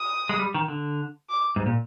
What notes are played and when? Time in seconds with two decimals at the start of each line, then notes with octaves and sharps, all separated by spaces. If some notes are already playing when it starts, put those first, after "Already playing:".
Already playing: D#6
0.29 G#3
0.39 G3
0.54 D#3
0.68 D3
1.29 D6
1.56 G#2
1.66 A#2